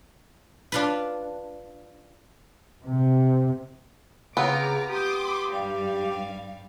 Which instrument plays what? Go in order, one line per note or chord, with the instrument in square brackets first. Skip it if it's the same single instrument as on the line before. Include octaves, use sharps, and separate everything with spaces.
[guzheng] D4 F4 B4
[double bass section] C3
[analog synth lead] C#3 [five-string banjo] B3 C4 F4 [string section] A#5 D6
[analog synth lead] G4 [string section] C6 D6 D#6
[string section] G2 G3 F5